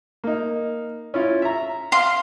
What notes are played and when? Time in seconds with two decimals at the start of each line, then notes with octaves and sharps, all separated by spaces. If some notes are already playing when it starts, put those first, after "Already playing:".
0.24 A#3 D#4
1.14 C#4 E4 F4
1.42 E5 A#5
1.92 F5 C6